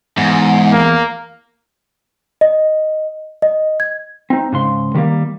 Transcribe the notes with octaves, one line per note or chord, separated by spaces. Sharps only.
E2 G#2
A#3
D#5
D#5
G#6
C4 D#4
G#2 C#3 C6
D#3 G3 A#3